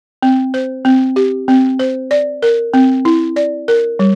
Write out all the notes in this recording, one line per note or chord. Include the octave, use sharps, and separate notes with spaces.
C4
C5
C4
G4
C4
C5
D5
A#4
C4
E4
D5
A#4
G3